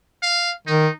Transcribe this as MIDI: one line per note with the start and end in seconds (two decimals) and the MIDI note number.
0.22 0.52 77
0.67 0.87 51
0.67 0.94 63